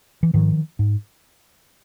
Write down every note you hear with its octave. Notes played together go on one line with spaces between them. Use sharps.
E3
G#2 D#3 F3
G#2